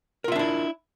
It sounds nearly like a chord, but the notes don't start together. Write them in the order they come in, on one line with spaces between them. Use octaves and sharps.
A#4 F4 E5 D4 E4